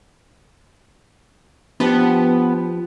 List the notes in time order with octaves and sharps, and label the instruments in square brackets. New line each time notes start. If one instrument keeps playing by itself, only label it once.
[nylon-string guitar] F3 D4 G4 [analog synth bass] B3